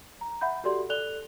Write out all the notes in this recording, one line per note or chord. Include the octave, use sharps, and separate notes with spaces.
A#5
E5 F#5 B5 G6
F#4 G4 A4 D5 C6
A4 D5 F#6 F7 G7